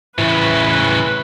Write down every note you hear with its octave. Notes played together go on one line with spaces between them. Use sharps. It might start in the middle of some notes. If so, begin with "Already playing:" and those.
A2 C#3 E3 B4